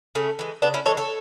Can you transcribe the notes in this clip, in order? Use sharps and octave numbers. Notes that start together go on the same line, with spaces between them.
C#3 A3 C#4
E3 G#3
C#3 B3 D4
C#4 E4
E3 G#3 A4 C#5
A4 C#5